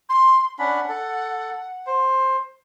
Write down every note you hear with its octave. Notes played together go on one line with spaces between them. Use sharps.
C6
C#4 D4 F#5 B5
A4
C5